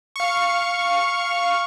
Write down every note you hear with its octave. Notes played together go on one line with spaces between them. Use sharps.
F5 C#6